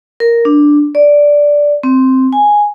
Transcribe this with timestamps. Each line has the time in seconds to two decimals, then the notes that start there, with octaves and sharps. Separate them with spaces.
0.20 A#4
0.45 D4
0.95 D5
1.83 C4
2.33 G#5